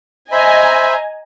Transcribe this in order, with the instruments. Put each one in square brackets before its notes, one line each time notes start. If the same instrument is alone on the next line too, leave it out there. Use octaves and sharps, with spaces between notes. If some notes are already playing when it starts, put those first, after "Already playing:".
[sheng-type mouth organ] C5 E5 B5 [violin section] D#5 G#5 A#5